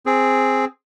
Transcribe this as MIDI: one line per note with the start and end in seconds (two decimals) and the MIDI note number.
0.06 0.65 60
0.06 0.65 68